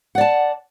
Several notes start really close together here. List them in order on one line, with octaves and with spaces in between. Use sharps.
F#5 D5 A5